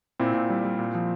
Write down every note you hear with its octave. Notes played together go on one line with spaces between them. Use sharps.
A#2 C4 E4
A#2
G3
G3
A#2
F3